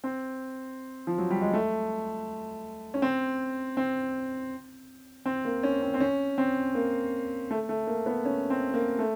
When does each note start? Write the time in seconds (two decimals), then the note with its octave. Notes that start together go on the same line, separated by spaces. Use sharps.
0.04 C4
1.07 F3
1.18 F#3
1.30 G3
1.41 G#3
1.54 A3
2.94 C#4
3.02 C4
3.77 C4
5.26 C4
5.45 A#3
5.63 C#4
5.82 C4
5.94 C4
6.00 C#4
6.38 C4
6.75 A#3
7.51 A3
7.69 A3
7.87 A#3
8.06 B3
8.25 C#4
8.50 C4
8.74 A#3
8.99 A3